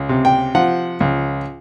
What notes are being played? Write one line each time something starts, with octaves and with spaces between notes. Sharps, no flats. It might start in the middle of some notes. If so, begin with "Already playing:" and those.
Already playing: C#2
C3
G5
F3 F#5
C#2